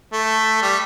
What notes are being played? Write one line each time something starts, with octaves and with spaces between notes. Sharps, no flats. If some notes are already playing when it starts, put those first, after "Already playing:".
A3
G3